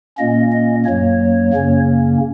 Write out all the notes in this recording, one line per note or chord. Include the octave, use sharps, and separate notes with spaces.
A#2 A#3 C#4 D#5
D#5
F#2 F#3 A#3 C#5
F#2 C#3 A#3 C#4